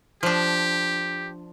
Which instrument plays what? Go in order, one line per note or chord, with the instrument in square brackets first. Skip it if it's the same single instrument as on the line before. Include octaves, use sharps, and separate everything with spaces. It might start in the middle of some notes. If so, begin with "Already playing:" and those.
[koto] F3 D4 [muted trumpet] G4